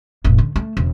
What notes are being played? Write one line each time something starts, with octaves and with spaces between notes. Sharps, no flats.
E1 A1
D3
A3
E1